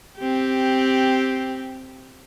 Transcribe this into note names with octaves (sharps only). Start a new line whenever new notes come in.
C4 G4